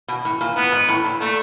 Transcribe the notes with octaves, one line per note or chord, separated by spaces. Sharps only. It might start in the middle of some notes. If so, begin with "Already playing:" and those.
B2
A2
A#2
A2 B3
G#2
A2
A#2
A#2 A3